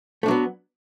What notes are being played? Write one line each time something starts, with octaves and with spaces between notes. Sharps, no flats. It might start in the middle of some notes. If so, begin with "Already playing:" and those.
F#3 A3 B3 D4